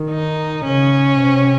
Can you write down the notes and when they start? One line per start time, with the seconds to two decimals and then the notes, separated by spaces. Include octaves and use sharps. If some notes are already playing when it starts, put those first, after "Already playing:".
Already playing: D#3
0.10 D#4
0.64 C#3 C#4
1.20 C3